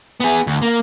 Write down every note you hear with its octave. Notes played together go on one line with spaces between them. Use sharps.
B3 G#4
D2
A#3